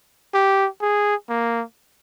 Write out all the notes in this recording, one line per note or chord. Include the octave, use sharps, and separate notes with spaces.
G4
G#4
A#3